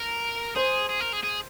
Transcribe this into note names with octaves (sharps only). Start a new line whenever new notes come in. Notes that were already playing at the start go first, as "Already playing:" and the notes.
Already playing: A#4
G#4 C5
G#4
A#4
G#4
G#4